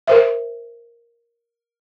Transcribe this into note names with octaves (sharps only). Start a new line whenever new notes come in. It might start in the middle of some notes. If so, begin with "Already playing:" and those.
A#4 C5 E5